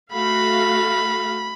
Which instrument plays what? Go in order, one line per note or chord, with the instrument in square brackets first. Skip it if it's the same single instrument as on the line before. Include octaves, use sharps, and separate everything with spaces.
[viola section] A3 F#4 F5 [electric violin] B5